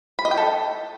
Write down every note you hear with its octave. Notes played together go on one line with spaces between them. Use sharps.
B5
D#5
G5
A4